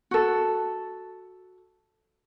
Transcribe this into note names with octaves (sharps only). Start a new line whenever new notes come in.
F#4 A4